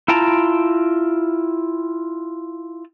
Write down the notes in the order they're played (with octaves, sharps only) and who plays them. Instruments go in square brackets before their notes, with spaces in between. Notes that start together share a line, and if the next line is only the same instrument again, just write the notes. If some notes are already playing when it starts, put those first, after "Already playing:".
[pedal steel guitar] E4 F4 G5 A5 A#5